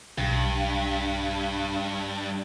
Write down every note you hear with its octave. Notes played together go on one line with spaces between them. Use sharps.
B1 G2